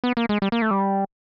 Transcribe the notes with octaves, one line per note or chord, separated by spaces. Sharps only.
B3
A#3
G#3
G3
A#3
A3
G3